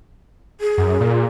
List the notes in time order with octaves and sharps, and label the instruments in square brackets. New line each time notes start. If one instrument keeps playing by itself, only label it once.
[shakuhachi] G#4
[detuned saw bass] F#2
A#2